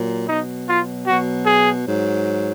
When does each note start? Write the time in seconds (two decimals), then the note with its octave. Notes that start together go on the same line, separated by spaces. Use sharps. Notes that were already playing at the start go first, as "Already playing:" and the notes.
Already playing: A#2 F#3
0.28 B2 F#3 D#4
0.68 F4
1.06 B2 F#3 F#4
1.46 G#4
1.85 G#2 F#3